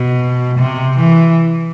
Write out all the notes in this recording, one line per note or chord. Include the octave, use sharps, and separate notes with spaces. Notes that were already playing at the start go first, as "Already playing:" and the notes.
Already playing: B2
C3
E3